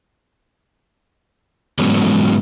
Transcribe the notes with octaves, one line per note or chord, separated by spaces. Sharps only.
G#2 E3 F#3 G#3 B3 C#4